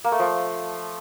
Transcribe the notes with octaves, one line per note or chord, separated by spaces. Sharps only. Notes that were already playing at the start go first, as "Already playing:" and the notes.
A#3
A3
F3